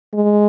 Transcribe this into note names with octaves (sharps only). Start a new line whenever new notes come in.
G#3